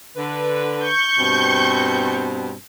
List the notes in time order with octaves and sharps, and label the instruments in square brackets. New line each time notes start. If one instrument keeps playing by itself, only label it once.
[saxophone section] D3 B4
[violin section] C#6 G6
[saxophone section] G2 B2 C4